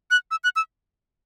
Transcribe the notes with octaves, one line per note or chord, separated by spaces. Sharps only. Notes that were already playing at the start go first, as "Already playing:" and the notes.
F#6
E6
F#6
E6